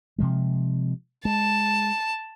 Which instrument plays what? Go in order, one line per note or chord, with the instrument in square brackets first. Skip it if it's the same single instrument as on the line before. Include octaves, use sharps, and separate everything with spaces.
[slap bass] C3 F3 G#3
[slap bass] G#3 [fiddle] A5